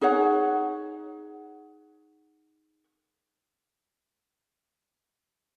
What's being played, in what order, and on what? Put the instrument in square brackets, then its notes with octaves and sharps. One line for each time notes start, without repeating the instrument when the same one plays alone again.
[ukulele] D#4 G#4 C#5 F#5